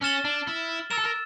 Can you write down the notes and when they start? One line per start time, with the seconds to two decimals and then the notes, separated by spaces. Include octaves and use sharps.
0.02 C#4 F6 A6 E7 G7
0.25 D4
0.47 E4
0.91 A#4 E6 A6 E7
0.98 A4
1.05 A#4